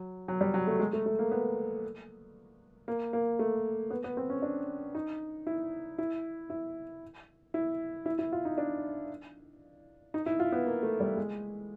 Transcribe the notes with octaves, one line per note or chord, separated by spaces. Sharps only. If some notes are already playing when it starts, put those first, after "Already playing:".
Already playing: F#3
F#3
G3
F#3
A3
G#3
A3
A3
A#3
B3
A#3
A#3
A3
B3
B3
C4
C#4
D4
D#4
E4
E4
E4
E4
E4
E4
F4
D#4
D4
D#4
E4
F4
B3
A#3
A3
G3
G#3